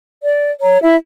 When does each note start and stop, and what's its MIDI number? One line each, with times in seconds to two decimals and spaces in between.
0.22 0.51 74
0.61 0.78 73
0.61 0.78 82
0.82 0.97 64
0.82 0.97 76